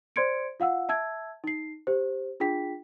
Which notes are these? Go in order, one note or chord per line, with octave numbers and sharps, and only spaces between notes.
C5 D5 C6 G#6 C#7 D7
F4 F5 F#5 E6
E5 A5 E6 G#6
D#4 C7
G4 C5
D4 F4 G#4 G5 B6